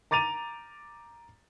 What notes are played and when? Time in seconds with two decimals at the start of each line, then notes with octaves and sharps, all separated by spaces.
0.11 A#5 D6 A6 D#7 F7